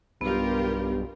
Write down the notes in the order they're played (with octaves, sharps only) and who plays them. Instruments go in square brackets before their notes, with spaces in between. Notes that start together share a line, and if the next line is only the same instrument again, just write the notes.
[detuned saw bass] B1 [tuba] G2 [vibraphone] B3 [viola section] F4 G4 A#4